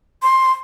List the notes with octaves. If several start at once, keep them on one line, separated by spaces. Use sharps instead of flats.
C6